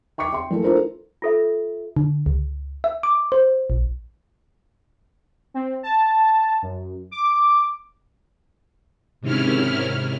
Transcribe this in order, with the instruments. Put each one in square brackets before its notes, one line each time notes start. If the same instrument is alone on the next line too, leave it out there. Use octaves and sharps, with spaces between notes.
[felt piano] G5 C#6 D6 C#7
E5 G5 C6
E3 A3 A#3
D4 E4 F4 A4 A#4 C5
[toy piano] F4 A4 E5
[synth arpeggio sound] D3
C#2
E5
D6
C5
A#1
[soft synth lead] C4
A5
F#2
D6
[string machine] G#2 C3 D#3 C#4 E4 F6